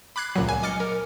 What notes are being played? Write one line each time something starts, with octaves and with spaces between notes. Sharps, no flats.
B5 D6 F#6 G#6 C7
C#2 A#2 F#3
G#5
D#5 D6 F6 A6 C#7
A#4